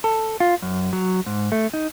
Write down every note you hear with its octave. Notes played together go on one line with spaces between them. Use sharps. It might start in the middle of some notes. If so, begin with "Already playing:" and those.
A4
F4
F#2
F#3
G#2
A3
D#4